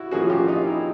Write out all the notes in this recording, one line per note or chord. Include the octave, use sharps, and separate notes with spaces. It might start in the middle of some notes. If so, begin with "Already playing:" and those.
Already playing: E4 F#4
A2 F3 A#3 C#4 F#4 G#4
F4 G4
D#4 F4
E4